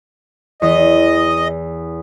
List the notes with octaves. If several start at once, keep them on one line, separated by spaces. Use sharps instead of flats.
E2 D#5